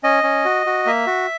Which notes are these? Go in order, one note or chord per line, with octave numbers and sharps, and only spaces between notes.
C#4 D#5
C#4
F#4
F#4
A#3 E5
F#4